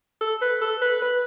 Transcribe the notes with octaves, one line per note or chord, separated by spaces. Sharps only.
A4
B4
A4
B4
B4